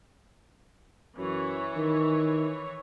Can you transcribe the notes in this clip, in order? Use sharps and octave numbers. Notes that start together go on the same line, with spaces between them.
F#2 E3 C#5
D#3